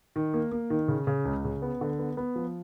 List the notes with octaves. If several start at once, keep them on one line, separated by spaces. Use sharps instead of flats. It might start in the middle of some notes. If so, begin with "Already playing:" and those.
D#3
A#3
A#3
D#3
C#3
C#3
C#2
C#3
B3
D3
B3
B3
F3